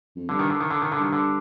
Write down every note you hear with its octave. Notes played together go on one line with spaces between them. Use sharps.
F2
G2 D3
D#3
D3
D#3
D3
D#3
D3
G2 D#3
D3